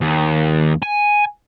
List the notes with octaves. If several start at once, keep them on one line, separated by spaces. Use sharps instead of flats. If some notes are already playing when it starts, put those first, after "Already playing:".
D#2
G#5